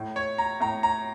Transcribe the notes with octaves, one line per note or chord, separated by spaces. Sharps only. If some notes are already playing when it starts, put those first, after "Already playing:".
Already playing: A2
C#5
A#5
A2 A#5
A#5